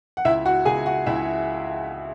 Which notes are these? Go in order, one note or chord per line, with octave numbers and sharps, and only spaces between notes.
F#5
C#2 E4 E5
F#4 F#5
C#2 G#4 G#5
F#4 F#5
C#2 E4 E5